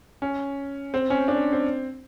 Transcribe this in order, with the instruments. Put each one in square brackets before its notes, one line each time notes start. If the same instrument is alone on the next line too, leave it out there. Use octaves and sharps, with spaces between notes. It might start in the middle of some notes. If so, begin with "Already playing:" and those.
[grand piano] C#4
C4
C#4
D4
C4